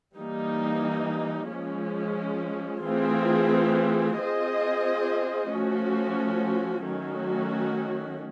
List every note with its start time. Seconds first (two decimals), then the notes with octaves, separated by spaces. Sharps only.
0.16 E3 G3 A#3 D#4
1.50 F3 G#3 C#4
2.84 E3 A3 C4 F4 G#4
4.18 C4 F4 G#4 C5 D#5
5.52 F3 A3 C#4 F#4
6.86 D#3 F#3 A3 C#4 F#4